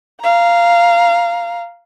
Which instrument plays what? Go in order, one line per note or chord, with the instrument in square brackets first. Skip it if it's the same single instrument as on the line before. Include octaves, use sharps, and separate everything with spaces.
[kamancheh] F5 A#5